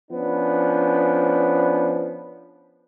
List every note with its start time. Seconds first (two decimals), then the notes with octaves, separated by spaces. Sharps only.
0.11 F3 B3 C#4 D4